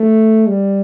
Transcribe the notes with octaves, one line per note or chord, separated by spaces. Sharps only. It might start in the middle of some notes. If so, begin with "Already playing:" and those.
Already playing: A3
G3